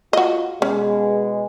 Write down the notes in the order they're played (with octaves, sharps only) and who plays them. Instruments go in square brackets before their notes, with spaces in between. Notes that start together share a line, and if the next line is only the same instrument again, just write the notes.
[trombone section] F4 [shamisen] F#4 D#5
[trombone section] B2 G#3 [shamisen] C#4